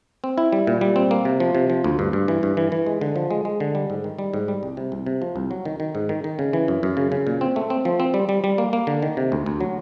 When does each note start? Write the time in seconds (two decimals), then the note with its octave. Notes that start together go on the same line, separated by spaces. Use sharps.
0.24 C4
0.38 E4
0.53 G3
0.67 A#2
0.81 G3
0.96 C4
1.11 A#3
1.25 C3
1.40 F3
1.55 C3
1.70 F3
1.84 D2
1.99 G2
2.13 G2
2.28 E3
2.43 G2
2.57 E3
2.72 E3
2.86 G#3
3.01 D3
3.16 F3
3.31 G#3
3.45 G#3
3.60 D3
3.75 G3
3.90 G#2
4.04 D#3
4.19 G3
4.34 G#2
4.48 G3
4.63 C2
4.77 C3
4.92 C2
5.06 C3
5.22 F3
5.36 C2
5.51 F#3
5.65 D#3
5.80 D#3
5.95 G#2
6.09 D#3
6.24 D#3
6.39 C#3
6.53 E3
6.68 F#2
6.83 F#2
6.97 C#3
7.12 C#3
7.27 A#2
7.41 C4
7.56 A3
7.70 C4
7.85 F3
8.00 C4
8.14 G3
8.29 G3
8.44 G3
8.58 A#3
8.73 A#3
8.87 D3
9.02 D#3
9.17 C3
9.32 D2
9.46 D2
9.61 F#3